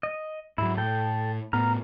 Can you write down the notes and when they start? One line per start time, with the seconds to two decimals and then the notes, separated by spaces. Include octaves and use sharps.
0.03 D#5
0.58 G#2 F#3 E4
0.77 A2 A4 G5
1.53 A2 B3 A#5 F6